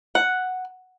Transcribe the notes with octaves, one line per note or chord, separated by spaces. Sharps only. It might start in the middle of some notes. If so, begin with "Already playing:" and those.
F#5